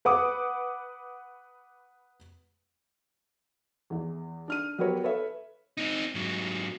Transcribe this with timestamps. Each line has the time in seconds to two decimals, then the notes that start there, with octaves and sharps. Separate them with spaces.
0.05 B4 F#5 D6 D#6
3.90 E2 E3
4.48 D4 F6 D#7
4.78 F#3 B3 G4 A#4 B4 C#5
5.03 A4 B4 C#5 E5
5.77 C4 D#4
6.15 G#2 F#3